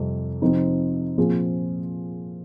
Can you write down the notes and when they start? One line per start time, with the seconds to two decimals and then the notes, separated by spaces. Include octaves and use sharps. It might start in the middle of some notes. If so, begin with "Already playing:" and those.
Already playing: F2 C3 G3
0.42 C3 F3 C4 D#4
1.18 A#2 F3 C4 F4 G#4